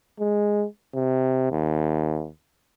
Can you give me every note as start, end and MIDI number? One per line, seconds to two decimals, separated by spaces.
0.20 0.66 56
0.95 1.49 48
1.52 2.29 39